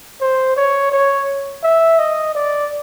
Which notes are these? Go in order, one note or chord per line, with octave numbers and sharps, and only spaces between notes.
C5
C#5
C#5
E5
D#5
D5